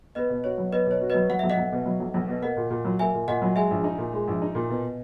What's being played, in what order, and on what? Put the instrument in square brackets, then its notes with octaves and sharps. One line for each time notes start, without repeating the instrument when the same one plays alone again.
[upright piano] B3 [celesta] B4 D#5
[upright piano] B2
[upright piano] F#4 [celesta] C#5
[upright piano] F#3
[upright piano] B3 [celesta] B4 D#5
[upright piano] B2 [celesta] C#5
[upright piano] F#4
[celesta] B4 D#5
[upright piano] F#3
[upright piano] F#3 [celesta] F#5
[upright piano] B1 [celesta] E5
[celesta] D#5 F#5
[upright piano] B1
B2
F#3
B1
B1
B2
[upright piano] A#3 [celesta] D#5 F#5
[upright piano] A#2
A#2
F#3
[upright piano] A#3 [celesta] E5 G#5
[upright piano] A#2
[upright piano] A#2 [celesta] D#5 F#5
[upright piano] F#3
[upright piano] G#3 [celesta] E5 G#5
[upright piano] A#1
D#4
A#2
G#3
A#1
D#4
A#2
B2